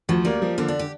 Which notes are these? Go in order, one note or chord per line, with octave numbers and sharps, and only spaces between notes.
D2 F3
G3 A#3
F3
D3 A#3
D4
G4